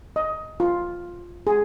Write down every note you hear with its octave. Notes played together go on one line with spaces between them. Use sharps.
D#5
F4
G#4